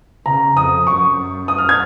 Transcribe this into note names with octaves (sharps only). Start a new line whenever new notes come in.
C#3 A#5
F2 D#6
F#2 C#6
D#6
F6
G#6